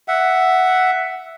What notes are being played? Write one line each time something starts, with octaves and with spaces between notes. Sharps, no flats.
E5 F#5